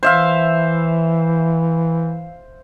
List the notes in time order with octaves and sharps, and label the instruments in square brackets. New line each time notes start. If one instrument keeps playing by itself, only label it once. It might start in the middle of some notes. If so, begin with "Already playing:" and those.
[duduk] E3 [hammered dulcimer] C5 E5 F5